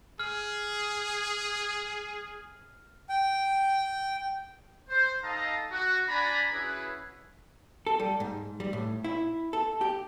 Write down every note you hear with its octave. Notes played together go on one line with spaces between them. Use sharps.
G#4 F6
G5
C5
D#4 A4 D#5 F5 A5 A#5
F#4
D4 D5 G#5 A#5 B5
C#4 E4 F#4 G#4 B4
A4
G3
G#2
G3
A2
E4
A4
G4